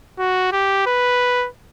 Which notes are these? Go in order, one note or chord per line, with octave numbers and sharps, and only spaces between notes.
F#4
G4
B4